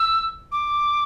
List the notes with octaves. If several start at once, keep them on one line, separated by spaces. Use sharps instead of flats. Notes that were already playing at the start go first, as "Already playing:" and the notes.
Already playing: E6
D6